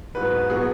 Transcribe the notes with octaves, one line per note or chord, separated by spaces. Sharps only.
G#2 F#3 B3 B4
B2 F#3 B3 G#4